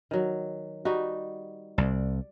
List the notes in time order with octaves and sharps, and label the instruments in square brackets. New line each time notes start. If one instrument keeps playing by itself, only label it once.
[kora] D#3 F#3
G3 D#4 F#4
[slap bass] C2 [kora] D5